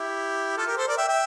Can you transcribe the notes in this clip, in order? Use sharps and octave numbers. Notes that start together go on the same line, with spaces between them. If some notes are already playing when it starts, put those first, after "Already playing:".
Already playing: E4 G4
F4 A4
G4 A#4
A4 C5
A#4 D5
E5 G5
E5 G5